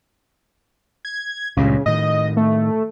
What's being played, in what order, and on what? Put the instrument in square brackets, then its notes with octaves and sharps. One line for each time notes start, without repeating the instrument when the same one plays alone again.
[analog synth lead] G#6
[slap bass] C#2 G2 A#2 [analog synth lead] C#3
[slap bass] A2 D#3 [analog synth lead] D#5
[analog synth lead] A3